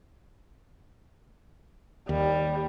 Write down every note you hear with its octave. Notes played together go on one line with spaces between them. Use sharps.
D#2 G3